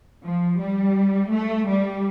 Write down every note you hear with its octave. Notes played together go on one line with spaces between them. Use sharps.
F3
G3
A3
G3